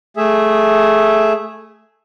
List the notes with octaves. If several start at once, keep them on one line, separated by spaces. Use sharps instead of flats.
A3 G#4 E5